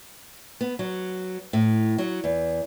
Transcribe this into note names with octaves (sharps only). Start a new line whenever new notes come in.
B3
F#3
A2
F#3
E2